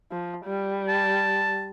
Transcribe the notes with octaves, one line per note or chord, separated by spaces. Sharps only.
F3
G3
A5